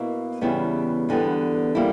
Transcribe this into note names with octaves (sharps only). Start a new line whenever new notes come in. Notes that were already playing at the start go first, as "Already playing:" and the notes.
Already playing: B2 A#3 E4
E2 C#3 G3 B3 E4
E2 D3 G3 B3
G3 A#3 E4